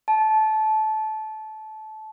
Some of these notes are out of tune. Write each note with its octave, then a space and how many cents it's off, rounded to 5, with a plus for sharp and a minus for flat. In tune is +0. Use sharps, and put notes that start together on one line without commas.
A5 -20